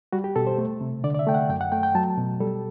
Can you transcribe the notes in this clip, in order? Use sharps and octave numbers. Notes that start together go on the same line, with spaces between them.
G3 F#4
G4
B2 A4
C5
A3
C3
D3 D5
D5
E5
A3 G5
F#5
F#2 G5
F#5
A3 G5
G5
F#3 A5
B2
G3 A4